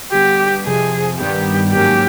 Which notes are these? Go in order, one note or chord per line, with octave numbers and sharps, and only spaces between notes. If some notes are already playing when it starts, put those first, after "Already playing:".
D3 G3 B3 G4
F2 C3 F3 G#4
G2 D#3 G3 B3 G4
G#2 D#3 F#3 A#3 C#4 G4